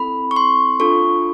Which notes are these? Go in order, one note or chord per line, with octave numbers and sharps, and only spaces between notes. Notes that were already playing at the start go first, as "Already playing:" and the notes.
Already playing: C4 E4 A4 B5
C#6
C6
D4 F4 A4 C#6